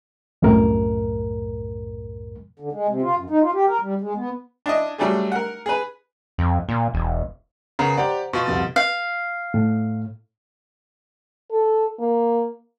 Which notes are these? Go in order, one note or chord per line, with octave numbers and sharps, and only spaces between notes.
C2 F#2 A2 A#4
D3
G#3
C3
F4
F#2
D#4
F4
G4
A#4
G3
G#3
B3
D4 E4 D#5
F#3 G3 A3 D4 G#4
A#4 F#5
G#4 B4
F2
A#2
E1
C#3 B3 A#4 F#5 A#5
G4 C5 D5 F#5 A#5
B2 F4 C#6 B6
C2 F2 A6
F5
A2
A4
A#3